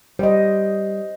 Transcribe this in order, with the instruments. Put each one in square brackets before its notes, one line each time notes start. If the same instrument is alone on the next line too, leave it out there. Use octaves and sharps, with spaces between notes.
[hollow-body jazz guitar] G3 [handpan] C5 D#5